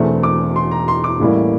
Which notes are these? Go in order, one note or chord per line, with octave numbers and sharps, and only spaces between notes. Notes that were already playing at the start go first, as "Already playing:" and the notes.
Already playing: E1 E2 E3 A3 C4
D6
C6
A#5
C6
D6
A1 A2 E3 G3 A#3